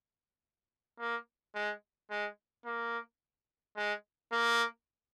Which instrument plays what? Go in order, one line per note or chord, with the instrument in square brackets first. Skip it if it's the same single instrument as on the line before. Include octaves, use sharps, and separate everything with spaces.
[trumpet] A#3
G#3
G#3
A#3
G#3
A#3